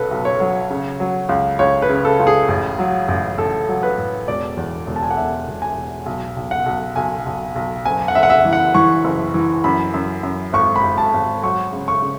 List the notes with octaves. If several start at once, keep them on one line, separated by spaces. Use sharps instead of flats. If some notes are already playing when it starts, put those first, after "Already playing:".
Already playing: B1 F#3 A4 B4
B1
C#5
F#3
C#3
F#3
C#2
C#2 C#5
B4
C#3
A4
C#2
G#4
A1
F#3
A1
A1 A4
F#3
B4
A2
E1 D5
E2
E1
A5
G#5
F#5
E1 E5
E1
G#5
E1
B1
B1
F#5
B1
B1 G#5
B1
B1
F#1 G#5
F#5
F#1 E5
F#5
E5
E3
F#5
E3 C#6
F#1
E3
F#2 B5
F#2
F#2
G#1 C#6
B5
G#1
A5
G#1
F#3 C#6
C#3
C#6
C#3